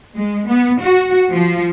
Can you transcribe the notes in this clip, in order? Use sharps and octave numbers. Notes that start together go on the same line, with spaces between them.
G#3
B3
F#4
F3